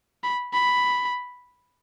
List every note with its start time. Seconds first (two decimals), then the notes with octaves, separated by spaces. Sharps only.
0.23 B5
0.54 B5